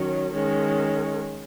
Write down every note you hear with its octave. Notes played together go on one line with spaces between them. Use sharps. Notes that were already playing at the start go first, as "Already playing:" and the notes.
Already playing: D#3 F#3 C#4
D#3 G#3 C#4